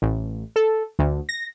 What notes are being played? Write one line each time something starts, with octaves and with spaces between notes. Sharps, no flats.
A1
A4
D2
A#6